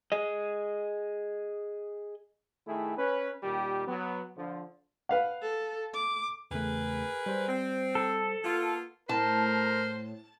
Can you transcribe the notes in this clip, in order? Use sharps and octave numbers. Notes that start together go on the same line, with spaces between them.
G#4 D#5
D#3 A3 E4 G#4
C#4 B4
A#2 D#3 G3 G4
F#3 B3
D3 F3
B4 F5 F#5
A4
D6
E2 C#3 A3 G#4 A#4 B4
G3 C5
C4
A4
A#3 B3 F4
A2 A#4 C5 A5